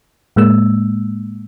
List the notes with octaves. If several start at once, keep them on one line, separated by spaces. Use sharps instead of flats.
A2 G#3 A#3 E6